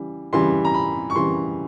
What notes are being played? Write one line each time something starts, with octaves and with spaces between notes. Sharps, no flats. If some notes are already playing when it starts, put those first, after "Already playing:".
Already playing: C#3 E3 G3
C#3 E3 G3 C6
A#5
B5
C#6
C#3 E3 G3 C6